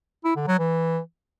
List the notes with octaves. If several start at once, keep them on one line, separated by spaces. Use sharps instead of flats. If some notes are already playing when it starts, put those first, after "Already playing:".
E4
D3
F#3
E3